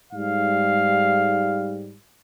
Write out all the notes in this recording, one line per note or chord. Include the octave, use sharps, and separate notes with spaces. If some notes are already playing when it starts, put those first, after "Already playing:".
G#2 G3 F5